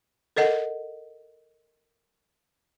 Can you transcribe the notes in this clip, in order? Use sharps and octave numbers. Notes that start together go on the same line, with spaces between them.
A4 A#4 D#5 F#5